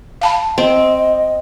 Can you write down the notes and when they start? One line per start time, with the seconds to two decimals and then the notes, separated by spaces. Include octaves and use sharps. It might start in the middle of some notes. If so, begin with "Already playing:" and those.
0.21 F5 A5 B5
0.58 C4 D#5